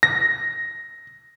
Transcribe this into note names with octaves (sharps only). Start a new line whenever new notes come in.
A#6